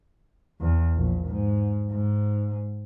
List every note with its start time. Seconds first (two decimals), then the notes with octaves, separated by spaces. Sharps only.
0.61 E2
0.96 A#1
1.28 G#2
1.90 G#2